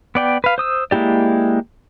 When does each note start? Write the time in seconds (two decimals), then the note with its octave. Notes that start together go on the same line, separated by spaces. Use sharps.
0.15 B3 D5 G5
0.44 B4 F5
0.58 C5 D#6 E6
0.91 G#3 A#3 E4 G4 D5